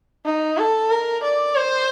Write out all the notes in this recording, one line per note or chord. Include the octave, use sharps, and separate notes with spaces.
D#4
A4
A#4
D5
C5